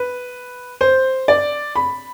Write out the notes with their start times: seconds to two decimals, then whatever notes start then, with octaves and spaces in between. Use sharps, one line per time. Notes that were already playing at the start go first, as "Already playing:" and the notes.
Already playing: B4
0.81 C5
1.28 D5
1.76 B5